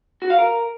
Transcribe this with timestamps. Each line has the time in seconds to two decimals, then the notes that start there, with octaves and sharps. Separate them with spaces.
0.22 F#4
0.30 F5
0.39 A#4